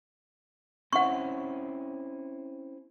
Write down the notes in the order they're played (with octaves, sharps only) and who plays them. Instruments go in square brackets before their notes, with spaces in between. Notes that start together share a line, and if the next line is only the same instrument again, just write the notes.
[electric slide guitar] C4 C#4 E4 [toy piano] F#5 C#6